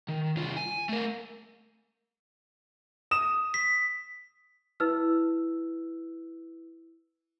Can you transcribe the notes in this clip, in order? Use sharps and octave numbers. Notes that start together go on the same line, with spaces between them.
D#3
C2 F4
G#5
A3 A#4
D#6 E7
B6
E4 B4 E6 F6